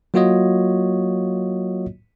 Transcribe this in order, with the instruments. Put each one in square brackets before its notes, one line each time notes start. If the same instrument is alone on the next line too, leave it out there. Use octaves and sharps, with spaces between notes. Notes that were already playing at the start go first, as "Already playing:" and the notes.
[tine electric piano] F#3 A#3 F4 F#4 C#5 D#5